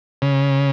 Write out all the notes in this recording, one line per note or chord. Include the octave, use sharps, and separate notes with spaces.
C#3